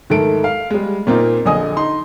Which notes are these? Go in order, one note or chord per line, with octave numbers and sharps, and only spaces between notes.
G#2 D#3 A3 A4 D7
F5
G3 G#3
A#2 A#3 C4 D#4 F4
A#1 D3 D#5 G#5 D#6
D#4 C6